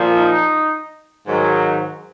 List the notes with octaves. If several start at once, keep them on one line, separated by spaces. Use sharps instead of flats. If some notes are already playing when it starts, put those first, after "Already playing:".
Already playing: A#2 F3
D#4
G#2 D#3 F#3